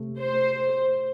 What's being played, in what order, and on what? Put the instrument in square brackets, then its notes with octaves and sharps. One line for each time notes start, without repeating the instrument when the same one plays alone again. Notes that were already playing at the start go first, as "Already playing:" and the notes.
Already playing: [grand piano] C3 A3
[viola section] C5